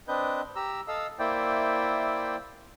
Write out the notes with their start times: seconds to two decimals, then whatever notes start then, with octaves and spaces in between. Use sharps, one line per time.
0.08 C4 D4 B4 D#5 G6
0.56 G4 A#5 E6
0.88 A4 D#5 F5 E6
1.19 A#3 E4 C5 D5 E5 G5